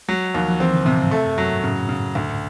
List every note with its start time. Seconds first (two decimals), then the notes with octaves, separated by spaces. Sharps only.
0.08 F#3 G#3
0.34 D#2 F3
0.48 F3
0.60 E3 C4
0.74 D3
0.86 A2 C3
0.99 G#2
1.11 A3
1.25 F#2
1.37 F#2 F#3
1.51 G#2
1.63 A2 C#3
1.89 C#3
2.15 D2